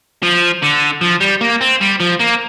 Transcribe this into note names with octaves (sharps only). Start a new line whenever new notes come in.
F3
D3
F3
G3
A#3
C4
G3
F3
A#3